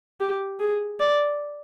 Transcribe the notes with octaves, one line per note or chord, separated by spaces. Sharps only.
G4
G#4
D5